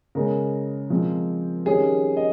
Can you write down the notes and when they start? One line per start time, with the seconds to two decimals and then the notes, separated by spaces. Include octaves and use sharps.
0.15 C#3 G#3 C#4 A#4
0.90 F3 G#3 C4
1.66 D#3 G3 C#4 G#4
2.17 D#5